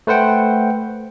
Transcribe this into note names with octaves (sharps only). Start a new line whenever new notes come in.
A3 B4 C5 F#5 G5